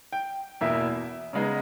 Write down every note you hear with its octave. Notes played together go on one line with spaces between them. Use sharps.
G5
E2 B2 A#3 E4 E5
C#3 G#3 B3 D#4